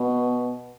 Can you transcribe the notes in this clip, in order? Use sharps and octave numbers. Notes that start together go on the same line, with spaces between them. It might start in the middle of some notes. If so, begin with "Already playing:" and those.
Already playing: B2 B3